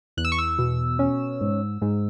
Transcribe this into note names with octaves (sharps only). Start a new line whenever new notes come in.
E2 F#6
E6
C#6
E6
B2
C#4
G#2
G#2